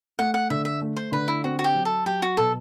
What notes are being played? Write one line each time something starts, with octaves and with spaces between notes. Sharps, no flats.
A3 F#5
F#5
D3 E5
E5
A3
C5
D3 B4
E4
C4 F#4
F#4
G4
F#3
A4
F#3 G4
F#4
B2 A4